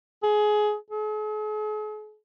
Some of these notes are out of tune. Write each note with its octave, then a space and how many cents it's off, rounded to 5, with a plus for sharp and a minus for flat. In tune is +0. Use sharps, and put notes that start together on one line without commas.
G#4 +20
G#4 +45